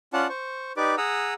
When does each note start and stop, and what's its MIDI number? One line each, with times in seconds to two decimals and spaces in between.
0.13 0.28 61
0.13 0.28 65
0.13 0.28 74
0.13 0.28 78
0.13 0.28 81
0.29 0.72 72
0.29 0.72 85
0.77 0.95 63
0.77 0.95 67
0.77 0.95 71
0.77 0.95 74
0.77 0.95 86
0.98 1.34 68
0.98 1.34 78
0.98 1.34 82
0.98 1.34 87
0.98 1.34 88